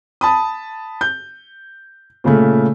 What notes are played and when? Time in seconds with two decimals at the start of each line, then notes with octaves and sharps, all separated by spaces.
0.21 A5 B5 D#6
1.01 G6
2.24 A#2 C#3 A3